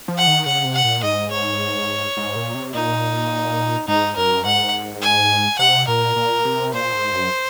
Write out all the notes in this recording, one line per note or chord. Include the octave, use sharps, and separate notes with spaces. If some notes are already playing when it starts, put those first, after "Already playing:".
F3
F#5
D#3
C#3 F#5
C3
F#5
A#2
G#2 D#5
C#5
G#2
A#2
C3
A#2 D#4
G#2 D#4
F#2 A#4
G#2 F#5
G#5
C3 F#5
A#2 A#4
A#2
C3
A#2 C5
G#2
F#2